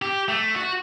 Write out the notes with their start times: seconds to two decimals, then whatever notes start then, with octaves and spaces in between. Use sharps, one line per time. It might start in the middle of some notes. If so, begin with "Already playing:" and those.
0.02 G4
0.28 A3
0.55 F#4